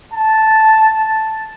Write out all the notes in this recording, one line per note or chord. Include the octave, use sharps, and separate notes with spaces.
A5